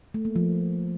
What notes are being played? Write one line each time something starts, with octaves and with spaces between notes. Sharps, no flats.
A3
A#3
F3